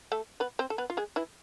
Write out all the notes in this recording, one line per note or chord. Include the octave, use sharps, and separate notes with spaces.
A3 A4
B3 B4
C4 C5
A4
B3 B4
F4
G#3 G#4
E3 E4